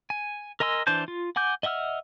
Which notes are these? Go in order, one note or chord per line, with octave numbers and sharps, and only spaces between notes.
G#5
A#4 D#5 G#5 C6 E6
E3 D4 C5 A5 G6
F4
F#5 G#5 D6 G6
D#5 E5 F#5 E6 F6